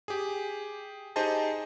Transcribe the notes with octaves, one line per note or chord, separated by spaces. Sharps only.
G4 G#4
D#4 G4 G#4 C5 D#5 A5